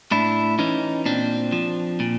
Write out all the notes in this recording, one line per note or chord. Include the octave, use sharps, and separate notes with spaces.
A2 D4 E4
E3 C#4 D#4
A#2 C4 D4
F3
A#2